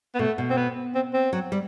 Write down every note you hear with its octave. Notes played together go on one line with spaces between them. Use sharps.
B3
B2 A3
B2
C4
B3
C4
C4
F#3
G3